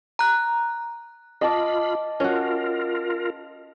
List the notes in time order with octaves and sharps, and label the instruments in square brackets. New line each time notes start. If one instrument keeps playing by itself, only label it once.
[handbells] A#5 F#6
[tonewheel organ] F4 B5 [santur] D#5 A5 D6
[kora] C#4 F#4 [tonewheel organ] F4 A#4